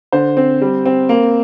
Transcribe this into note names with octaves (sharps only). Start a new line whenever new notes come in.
D3 C5
C4
G3
C4
A#3